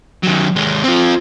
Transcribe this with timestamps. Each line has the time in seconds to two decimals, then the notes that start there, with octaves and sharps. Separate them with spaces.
0.23 D#3 F#3
0.56 D#2 G#3
0.84 C4 F4